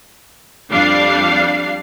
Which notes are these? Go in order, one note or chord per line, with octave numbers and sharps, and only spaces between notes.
F2 G3 D4 F5 C7